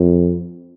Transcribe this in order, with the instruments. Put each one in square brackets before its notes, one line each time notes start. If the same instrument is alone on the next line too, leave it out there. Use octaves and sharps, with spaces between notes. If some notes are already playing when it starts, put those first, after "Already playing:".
Already playing: [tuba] F2